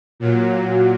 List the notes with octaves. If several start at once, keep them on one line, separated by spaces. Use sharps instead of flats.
A#2 F#3